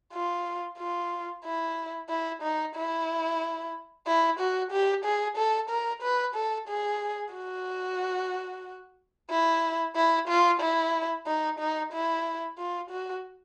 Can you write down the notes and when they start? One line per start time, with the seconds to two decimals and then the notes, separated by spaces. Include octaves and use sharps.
0.14 F4
0.78 F4
1.45 E4
2.09 E4
2.42 D#4
2.76 E4
4.07 E4
4.40 F#4
4.71 G4
5.05 G#4
5.37 A4
5.70 A#4
6.02 B4
6.35 A4
6.68 G#4
7.34 F#4
9.30 E4
9.96 E4
10.28 F4
10.60 E4
11.26 D#4
11.59 D#4
11.93 E4
12.58 F4
12.90 F#4